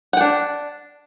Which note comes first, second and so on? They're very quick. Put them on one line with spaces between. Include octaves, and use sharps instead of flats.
F#5 G5 D4